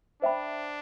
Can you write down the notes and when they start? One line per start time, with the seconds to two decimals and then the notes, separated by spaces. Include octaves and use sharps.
0.22 D4 C5 E5 G5 B5